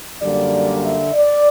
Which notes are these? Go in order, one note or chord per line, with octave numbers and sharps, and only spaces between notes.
F#2 D3 G3 A#3 D5
E5
D5